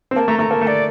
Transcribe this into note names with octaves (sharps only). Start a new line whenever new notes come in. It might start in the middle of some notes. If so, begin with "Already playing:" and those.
C4
A#3 A5
A3 A#5
A3 A#5
A#3 A5
A3
D5